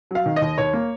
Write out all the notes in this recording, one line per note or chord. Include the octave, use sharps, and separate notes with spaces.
F#3 F5
D#3
D#5
D#2
D#2 C#5
A#3